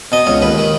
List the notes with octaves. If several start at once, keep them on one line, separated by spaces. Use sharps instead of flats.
B2 D#5
C#2 C#5
D#2 B4
D#3